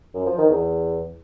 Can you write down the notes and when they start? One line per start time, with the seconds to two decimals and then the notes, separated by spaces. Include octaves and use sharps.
0.14 F#2
0.26 F3
0.38 D#3
0.50 E2